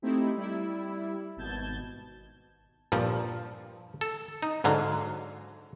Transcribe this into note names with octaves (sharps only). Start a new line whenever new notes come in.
A3 C4 D#4 E4 G4
G3 E4
G#1 B2 A5 G6 G#6
G2 A#2 F3
A4
D#4
G#2 D3 F#3 F5